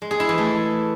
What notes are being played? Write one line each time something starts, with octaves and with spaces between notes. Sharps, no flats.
G#3
G#4
E4
E3
A3